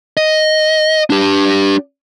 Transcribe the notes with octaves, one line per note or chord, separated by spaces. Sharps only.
D#5
D4 G4